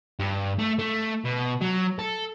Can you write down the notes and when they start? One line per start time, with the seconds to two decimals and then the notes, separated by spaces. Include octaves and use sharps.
0.19 G2
0.59 A3
0.79 A3
1.25 B2
1.61 F#3
1.99 A4